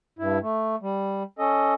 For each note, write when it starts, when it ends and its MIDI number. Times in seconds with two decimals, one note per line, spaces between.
0.19 0.39 43
0.19 0.39 64
0.41 0.76 57
0.82 1.23 55
1.39 1.74 61
1.39 1.74 69
1.39 1.74 75